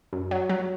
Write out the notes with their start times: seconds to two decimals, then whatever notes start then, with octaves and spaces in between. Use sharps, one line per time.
0.13 F#2
0.31 F#3
0.49 F#3